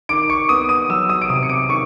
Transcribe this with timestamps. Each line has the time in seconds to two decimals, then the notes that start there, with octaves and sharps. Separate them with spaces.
0.09 D#3 D6 D7
0.30 C#6 C#7
0.49 B3 D#6 D#7
0.69 D#6 D#7
0.89 F#3 E6 E7
1.09 D#6 D#7
1.22 D7
1.29 C3 D#6 D#7
1.43 C#7
1.49 D6 D7
1.69 D#3 C#6 C#7